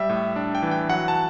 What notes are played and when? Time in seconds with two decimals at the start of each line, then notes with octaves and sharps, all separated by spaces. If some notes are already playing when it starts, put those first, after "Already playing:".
Already playing: G3 E5
0.09 A2
0.36 D4
0.55 G5
0.62 E3
0.71 G5
0.90 F#3 F#5
1.08 A5